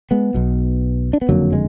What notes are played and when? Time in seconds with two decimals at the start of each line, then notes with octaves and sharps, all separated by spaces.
0.11 G#3 B3
0.34 B1 B2
1.13 D4
1.21 B3
1.29 F#1 F2 D3 F#3 A#3
1.53 G#3